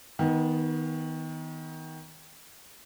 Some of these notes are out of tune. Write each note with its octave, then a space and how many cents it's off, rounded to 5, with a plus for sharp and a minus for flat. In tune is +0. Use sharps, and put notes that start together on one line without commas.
D#3 +25 B3 +0